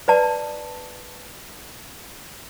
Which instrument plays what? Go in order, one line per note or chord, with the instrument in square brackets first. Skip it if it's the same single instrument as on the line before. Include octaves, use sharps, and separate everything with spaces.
[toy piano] B4 D5 A5